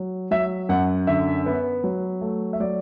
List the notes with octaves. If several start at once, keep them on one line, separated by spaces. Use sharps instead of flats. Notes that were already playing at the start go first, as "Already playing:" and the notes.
Already playing: F#3
F#3 E5
F#2 F#5
D3 E5
B3
F#3
A3
E5
F#3 D5